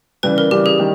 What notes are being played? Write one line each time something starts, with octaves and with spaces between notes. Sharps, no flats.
C#3 E3 G3 B4
A#4
C#3 E3 G3 G4
G#4
D#3 G3